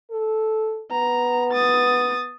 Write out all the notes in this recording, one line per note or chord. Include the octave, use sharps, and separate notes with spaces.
A4
B3 A#5
D#6 A6